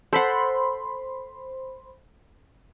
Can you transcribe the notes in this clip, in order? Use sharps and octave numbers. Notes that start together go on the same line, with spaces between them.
A4 C5 F#5 B5 C6